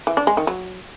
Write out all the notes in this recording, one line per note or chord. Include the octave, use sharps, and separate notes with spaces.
E3
D4
G#3
D#3
F#3